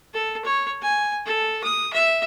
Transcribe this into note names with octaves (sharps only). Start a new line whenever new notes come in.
A4
C#5
G#5
A4
D#6
E5